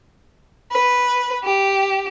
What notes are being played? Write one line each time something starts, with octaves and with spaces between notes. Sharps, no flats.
B4
G4